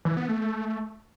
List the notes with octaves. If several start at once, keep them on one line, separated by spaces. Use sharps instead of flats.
E3
B3
A3